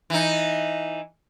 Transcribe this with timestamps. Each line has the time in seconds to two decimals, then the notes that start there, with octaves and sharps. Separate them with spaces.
0.10 E3 D#4